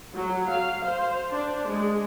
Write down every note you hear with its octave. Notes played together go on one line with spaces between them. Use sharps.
F#3
F5
C5
D4
G#3